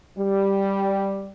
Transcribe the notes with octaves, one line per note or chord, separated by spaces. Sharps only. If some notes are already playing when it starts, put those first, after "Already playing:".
G3